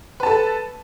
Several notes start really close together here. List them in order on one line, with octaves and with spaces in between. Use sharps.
B4 A5 A4